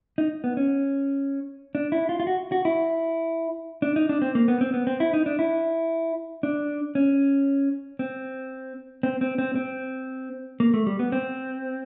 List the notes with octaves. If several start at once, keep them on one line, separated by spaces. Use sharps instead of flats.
D#4
B3
C#4
D4
E4
F4
F4
F#4
F#4
E4
D4
D#4
D4
C4
A#3
B3
C4
B3
C4
E4
D#4
D4
E4
D4
C#4
C4
C4
C4
C4
C4
A#3
A3
G3
B3
C4